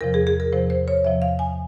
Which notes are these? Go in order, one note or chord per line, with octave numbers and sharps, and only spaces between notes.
E2 C3 F3 A#4
G#4
G#4
A#4
E2 C3 F3 C5
C5
C#5
E2 C3 F3 E5
F5
G#5